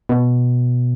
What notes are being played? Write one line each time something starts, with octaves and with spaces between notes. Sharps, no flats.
B2